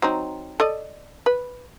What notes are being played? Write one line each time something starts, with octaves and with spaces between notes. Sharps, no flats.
F#3 C4 D#4
A4 D5 D#5
B4